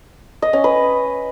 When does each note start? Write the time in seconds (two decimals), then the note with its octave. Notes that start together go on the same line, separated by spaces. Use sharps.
0.42 D#5
0.53 C#4
0.64 B4